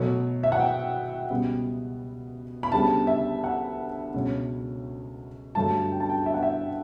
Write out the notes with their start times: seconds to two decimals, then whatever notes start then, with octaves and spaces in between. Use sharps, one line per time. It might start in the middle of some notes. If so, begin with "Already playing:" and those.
Already playing: B2 F#3 A3
0.43 E5
0.52 F#5
0.60 G5
1.30 C#2 B2 G3 B3
2.63 B5
2.72 D2 C#3 G3 B3 A5
3.07 E5
3.44 F#5
4.14 C#2 B2 F#3 C#4
5.55 G2 D3 F#3 A3 A5
5.91 G5
6.00 A5
6.09 G5
6.26 E5
6.34 F#5
6.43 E5